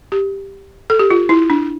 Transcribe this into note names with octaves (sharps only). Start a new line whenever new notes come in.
G4
A4
G4
F4
E4
D4